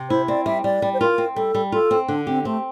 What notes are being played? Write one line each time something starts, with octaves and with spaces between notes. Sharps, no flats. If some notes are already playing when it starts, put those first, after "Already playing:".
Already playing: C3
E4 C5
C4 D5
G3 E5
G3 D5
G3
C5
F4 A#4
C4
G3 A4
G3
F4 A4
C4
D3 D4
C4 G4
A3 C4